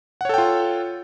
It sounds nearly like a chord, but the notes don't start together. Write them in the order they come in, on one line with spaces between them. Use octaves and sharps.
F#5 C#5 A4 G5 F4